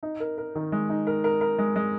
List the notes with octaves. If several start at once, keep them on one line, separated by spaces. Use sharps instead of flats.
D#4
A#4
A#4
D#3
G#3
D#4
A#4
A#4
A#4
G#3
G#3